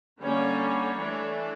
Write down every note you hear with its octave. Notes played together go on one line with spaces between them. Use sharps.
D3 G3 A#3 C#4 C#5
E3 A3 D4